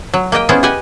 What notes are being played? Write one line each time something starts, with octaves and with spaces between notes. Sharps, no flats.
F#3
A#3 G4 D#5 G5
B3 C#4 E4 F4 G#4 C5
G4 B4 D#5 F#5 G#5